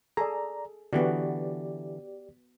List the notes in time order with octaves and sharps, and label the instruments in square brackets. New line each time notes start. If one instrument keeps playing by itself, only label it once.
[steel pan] G#4 A4 [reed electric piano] D5 A#5
[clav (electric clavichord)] D3 E3 [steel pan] B3 F#4 [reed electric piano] G4 D5